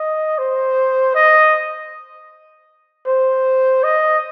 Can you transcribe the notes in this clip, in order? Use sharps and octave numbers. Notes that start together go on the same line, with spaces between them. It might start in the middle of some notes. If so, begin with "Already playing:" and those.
Already playing: D#5
C5
D#5
C5
D#5